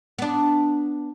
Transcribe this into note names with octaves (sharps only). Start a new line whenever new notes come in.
B3 D4